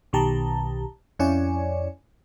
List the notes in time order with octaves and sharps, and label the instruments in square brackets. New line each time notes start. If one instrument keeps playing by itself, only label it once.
[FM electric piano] B1 B2 D#3 G4 A5 A#5
F2 C#4 E4 C#5 D5 G#5